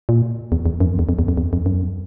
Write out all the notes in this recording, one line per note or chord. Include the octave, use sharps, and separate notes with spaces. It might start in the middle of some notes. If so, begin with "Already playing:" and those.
A#2
E2
E2
F#2
E2
F2
E2
F2
E2
F2
E2
F2
F#2